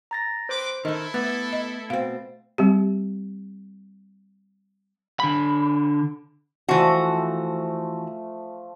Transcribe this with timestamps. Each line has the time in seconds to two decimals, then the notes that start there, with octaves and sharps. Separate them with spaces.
0.11 A#5 A6 A#6
0.49 C4 B4 C5 D6
0.85 D#3 D#4 E4 A4 D#5
1.14 A3 B3 A6
1.53 D#5
1.90 B2 C4 F5
2.58 G3 C4 G4
5.20 D3 B5
6.69 E3 F3 A3 F#4